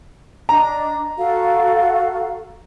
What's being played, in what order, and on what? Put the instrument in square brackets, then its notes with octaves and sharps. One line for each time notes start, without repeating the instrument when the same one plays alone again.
[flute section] D4 D#5 [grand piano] A#5
[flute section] F#4 A4 F5